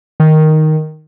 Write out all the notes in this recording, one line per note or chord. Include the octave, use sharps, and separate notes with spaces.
D#3